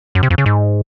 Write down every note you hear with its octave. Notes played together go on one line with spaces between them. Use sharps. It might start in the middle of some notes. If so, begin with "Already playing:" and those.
F#2
C3
F2
C#3
G#2